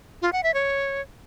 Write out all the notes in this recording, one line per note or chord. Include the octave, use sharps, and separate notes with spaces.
F4
F#5
E5
C#5